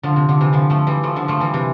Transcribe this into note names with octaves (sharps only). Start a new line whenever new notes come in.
D3 F3
C3
D3
C3 E3
D3 F3
F3 A3
E3 G3
F3 A3
D3 F3
F3 A3
E3 G3
C3 E3